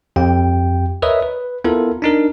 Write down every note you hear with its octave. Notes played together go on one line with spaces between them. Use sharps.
F2 G4 G5
A#4 B4 C#5 D#5 E5 D#6
B4
B3 E4 F4 A4 A#4
D4 D#4 A#4